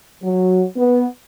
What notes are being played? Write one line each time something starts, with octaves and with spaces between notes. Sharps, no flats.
F#3
B3